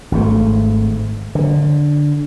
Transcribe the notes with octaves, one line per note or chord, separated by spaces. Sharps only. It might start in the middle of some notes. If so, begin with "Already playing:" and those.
G#1 G#2 A3
D3